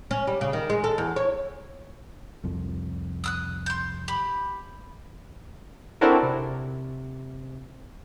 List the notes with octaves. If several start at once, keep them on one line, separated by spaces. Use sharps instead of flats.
C#4
G3
C#3
D#3
G#3
A4
E2
C#5
C2 F2
D#6 E6 F#6
C6 G6
G4 B5
C4 D4 E4 F#4 A4 A#4
C3